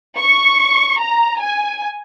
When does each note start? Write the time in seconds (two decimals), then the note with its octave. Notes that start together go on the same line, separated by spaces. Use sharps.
0.17 C#6
0.99 A#5
1.40 G#5